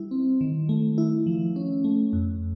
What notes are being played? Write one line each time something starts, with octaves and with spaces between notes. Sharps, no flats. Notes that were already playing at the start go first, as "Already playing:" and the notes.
Already playing: G3 E4
C4
D#3
A3
E4
F3
C#4
A3
F2